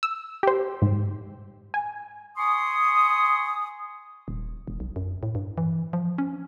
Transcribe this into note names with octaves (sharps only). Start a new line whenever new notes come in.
E6
G4 C5
G#2
G#5
G#5 C6 C#6 D#6
D#1
E1
B1
F#2
A2
G2
E3
F3
C#4